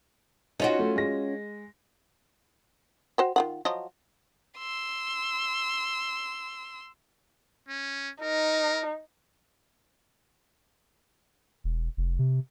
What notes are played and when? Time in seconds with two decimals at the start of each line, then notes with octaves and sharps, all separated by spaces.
0.60 C#4 D#4 F4 F#4 C#5 D#5
0.79 A3
0.96 G#3 A#6
3.18 F#4 C5 G5
3.36 D#3 F4 F#5
3.65 F3 F#3 D#5
4.58 C6 E6
7.69 C#4
8.23 D#4 A#4
11.64 E1
11.97 F1
12.19 C3